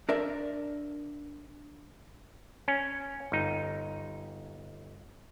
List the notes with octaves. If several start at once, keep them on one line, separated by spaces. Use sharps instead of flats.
D4 A#4 D5 E5
C#4
G1 D#4